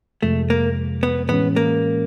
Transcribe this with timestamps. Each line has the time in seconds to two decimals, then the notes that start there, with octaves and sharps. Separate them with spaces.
0.22 F2 C3 F3 G#3 A3
0.50 A#3
1.03 B3
1.29 A2 E3 G#3 B3 C#4
1.56 A#3